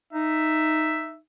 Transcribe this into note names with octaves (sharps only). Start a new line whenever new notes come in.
D#4 E5